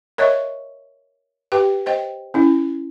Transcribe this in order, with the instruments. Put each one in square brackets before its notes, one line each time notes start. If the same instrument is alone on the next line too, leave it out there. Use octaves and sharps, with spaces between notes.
[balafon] A#4 C#5 D#5 E5 C#6
G4 B4 G5
C5 D#5 G5
C#4 E4